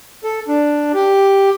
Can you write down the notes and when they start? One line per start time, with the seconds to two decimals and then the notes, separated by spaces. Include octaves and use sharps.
0.24 A4
0.48 D4
0.94 G4